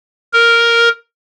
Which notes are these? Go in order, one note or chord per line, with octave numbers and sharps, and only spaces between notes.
A#4